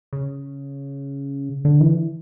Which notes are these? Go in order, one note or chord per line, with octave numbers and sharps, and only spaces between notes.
C#3
D3
E3